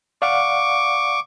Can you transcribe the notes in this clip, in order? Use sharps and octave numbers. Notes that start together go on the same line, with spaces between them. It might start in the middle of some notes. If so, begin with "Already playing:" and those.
D5 F5 F#5 C#6 D6